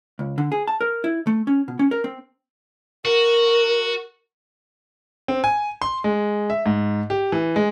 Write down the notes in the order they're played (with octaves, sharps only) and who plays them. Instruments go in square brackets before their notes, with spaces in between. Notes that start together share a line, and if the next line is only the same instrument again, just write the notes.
[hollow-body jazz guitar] C#2
D3
G#4
A5
A#4
E4
A3
C#4
B2
C#4
A#4
C4
[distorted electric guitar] F#4 [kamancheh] A#4
[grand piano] C4
G#5
C6
G#3
E5
G#2
G4
E3
G#3